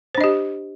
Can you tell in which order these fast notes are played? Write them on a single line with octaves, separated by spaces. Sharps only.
C5 D4 D#5 G4